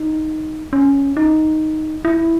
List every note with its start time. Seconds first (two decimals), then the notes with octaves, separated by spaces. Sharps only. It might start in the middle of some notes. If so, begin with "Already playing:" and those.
Already playing: D#4
0.73 C#4
1.17 D#4
2.05 E4